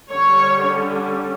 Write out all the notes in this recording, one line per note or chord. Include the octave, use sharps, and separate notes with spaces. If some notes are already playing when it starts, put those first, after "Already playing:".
D3 G3 C#4 C#5